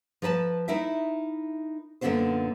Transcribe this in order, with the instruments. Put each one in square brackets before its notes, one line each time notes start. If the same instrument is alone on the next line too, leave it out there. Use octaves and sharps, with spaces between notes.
[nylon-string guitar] F3 A#4 B4 A5
D#4 E4 A#4 E5
F#2 A#2 D3 B3 C#4 C5